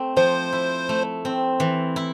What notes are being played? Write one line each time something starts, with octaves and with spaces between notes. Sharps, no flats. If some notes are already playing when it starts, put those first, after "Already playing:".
Already playing: A3 C4
F3 C5
E4
A3
C4
E3
E4